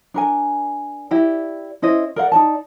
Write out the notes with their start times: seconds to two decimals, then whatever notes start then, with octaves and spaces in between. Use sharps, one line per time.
0.14 D4 A#4 G#5
1.11 E4 G4 D5
1.82 C#4 E4 C5 D#5
2.16 A#4 D5 F5 F#5
2.32 D#4 D5 A5